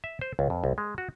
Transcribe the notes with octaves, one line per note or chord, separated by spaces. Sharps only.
E5
C5
C#2
F2
C2
G#3
F#4